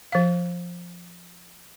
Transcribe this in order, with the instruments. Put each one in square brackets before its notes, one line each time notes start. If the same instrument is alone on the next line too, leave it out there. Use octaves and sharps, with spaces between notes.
[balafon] F3 F5